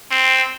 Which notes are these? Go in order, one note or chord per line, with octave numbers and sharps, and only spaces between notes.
C4